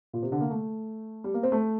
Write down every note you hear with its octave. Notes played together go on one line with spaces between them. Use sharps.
A#2
C3
D3
A#3
A3
G3
A#3
C4
A3